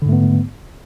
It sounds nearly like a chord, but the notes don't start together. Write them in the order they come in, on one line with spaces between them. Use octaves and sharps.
D3 G#2 A3 B3